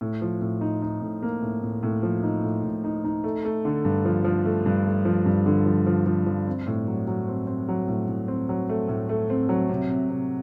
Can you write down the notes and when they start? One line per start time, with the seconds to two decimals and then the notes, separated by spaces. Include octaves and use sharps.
0.01 A2
0.22 F3
0.41 A2
0.61 D#4
0.82 D#4
1.02 A2
1.23 A#3
1.42 A2
1.62 A2
1.83 A2
2.03 F3
2.23 D#4
2.44 A2
2.63 A2
2.84 D#4
3.04 D#4
3.24 A3
3.45 A3
3.65 D3
3.85 G2
4.05 F3
4.24 F3
4.45 A3
4.66 G2
4.86 A3
5.05 F3
5.26 G2
5.46 D3
5.66 F3
5.87 F3
6.06 F3
6.26 F3
6.47 C4
6.67 A2
6.88 F#3
7.07 F#3
7.28 C4
7.47 C4
7.68 F#3
7.88 A2
8.08 A2
8.28 C4
8.49 F#3
8.69 A3
8.88 A2
9.09 A3
9.30 C4
9.49 F#3
9.69 C3
9.89 C3
10.10 C3